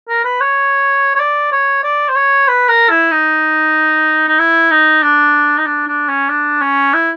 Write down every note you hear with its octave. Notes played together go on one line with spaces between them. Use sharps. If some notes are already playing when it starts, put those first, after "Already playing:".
A#4
B4
C#5
C#5
D5
C#5
D5
C5
C#5
B4
A#4
E4
D#4
D#4
E4
D#4
D4
D#4
D4
D4
C#4
D4
C#4
E4